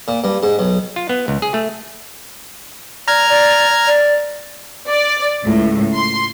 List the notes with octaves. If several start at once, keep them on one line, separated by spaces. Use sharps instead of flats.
A#2
G2
G#2
B1
F4
B3
C#2
G#4
A3
D5 A#5 F6 G#6
D5
D5
D5
C#2 A2
C6